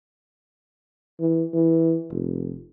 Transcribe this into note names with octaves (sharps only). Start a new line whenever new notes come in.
E3
E3
F1